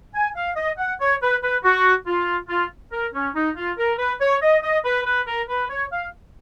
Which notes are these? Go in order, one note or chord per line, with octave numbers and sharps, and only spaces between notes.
G#5
F5
D#5
F#5
C#5
B4
B4
F#4
F4
F4
A#4
C#4
D#4
F4
A#4
B4
C#5
D#5
D#5
B4
B4
A#4
B4
C#5
F5